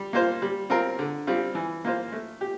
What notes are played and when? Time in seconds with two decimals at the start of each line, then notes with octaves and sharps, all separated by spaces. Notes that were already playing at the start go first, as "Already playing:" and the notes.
Already playing: G3
0.13 A#3 F4 C5
0.42 G3
0.70 C4 F4 A#4
0.99 D3
1.27 G3 C4 F4
1.55 E3
1.85 A#3 F4 C5
2.12 A3
2.41 G4